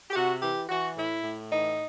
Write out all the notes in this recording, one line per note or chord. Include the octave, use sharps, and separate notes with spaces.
G4
C3 F#4
E3 G4
E3 F#4
A2 E4
A2
E3 D#4